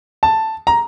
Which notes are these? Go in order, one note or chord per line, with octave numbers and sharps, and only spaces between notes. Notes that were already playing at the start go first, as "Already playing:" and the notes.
A5
A#5